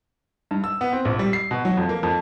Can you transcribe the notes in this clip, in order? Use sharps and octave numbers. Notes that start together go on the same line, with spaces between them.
G2
E6
B3
C4
A#1
G3
C7
B2
F#3
F2
A#3
F2